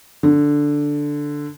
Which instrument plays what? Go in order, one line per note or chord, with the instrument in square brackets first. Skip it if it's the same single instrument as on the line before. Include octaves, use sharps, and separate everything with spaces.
[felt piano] D3